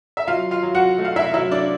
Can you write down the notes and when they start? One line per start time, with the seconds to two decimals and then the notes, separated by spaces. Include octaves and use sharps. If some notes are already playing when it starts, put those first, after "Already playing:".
0.17 E5
0.27 F#3 F4 F5
0.51 F4 F5
0.63 F#3
0.75 F#4 F#5
0.98 A3
1.05 F5
1.16 E4 E5
1.34 F#3 E4 E5
1.51 D4 D5